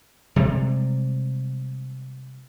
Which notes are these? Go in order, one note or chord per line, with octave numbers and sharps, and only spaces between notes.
C3 G3 G#3